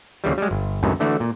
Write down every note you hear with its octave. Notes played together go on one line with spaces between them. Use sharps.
D#2 C#3 E3 G3
G3 G#3
G1
C#2 F#2 A2 C3 D#3
D3 E3 A3 F#4
A#2